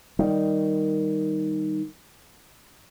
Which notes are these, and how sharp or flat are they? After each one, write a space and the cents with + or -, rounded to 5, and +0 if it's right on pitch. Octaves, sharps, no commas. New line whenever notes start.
D#3 +0 G3 +0